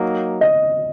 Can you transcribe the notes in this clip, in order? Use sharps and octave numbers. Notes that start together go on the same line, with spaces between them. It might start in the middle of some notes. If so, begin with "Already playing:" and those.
Already playing: F#3 A#3 D#4
D#5